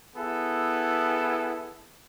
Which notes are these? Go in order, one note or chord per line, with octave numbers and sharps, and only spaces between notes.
B3 E4 G#4 A4